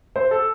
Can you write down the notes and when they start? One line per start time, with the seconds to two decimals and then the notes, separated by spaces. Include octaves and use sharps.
0.16 C5
0.31 A4